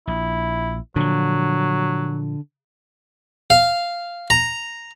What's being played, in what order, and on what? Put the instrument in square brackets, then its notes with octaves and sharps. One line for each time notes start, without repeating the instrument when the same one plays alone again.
[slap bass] A#1 [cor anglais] E4
[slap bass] A#2 F3 [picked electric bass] D3 [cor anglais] F#3
[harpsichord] F5
A#5